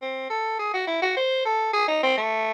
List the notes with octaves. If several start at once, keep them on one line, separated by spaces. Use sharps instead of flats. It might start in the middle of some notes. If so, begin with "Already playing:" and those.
C4
A4
G#4
F#4
E4
F#4
C5
A4
G#4
D#4
C4
A3